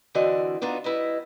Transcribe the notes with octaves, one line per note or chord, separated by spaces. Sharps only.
D3 E3 C4 F#4 D5 D#5
B3 D4 D#4 F4 F#4
G3 E4 B4 D#5